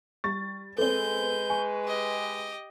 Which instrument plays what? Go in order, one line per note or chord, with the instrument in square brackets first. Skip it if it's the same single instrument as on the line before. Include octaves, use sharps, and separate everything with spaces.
[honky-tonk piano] G3 A6 [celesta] C#6
[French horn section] G#3 B4 [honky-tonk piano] B3 C4 [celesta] A4 G7 [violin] G6
[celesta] G#5 [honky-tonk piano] C#6
[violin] G4 D#5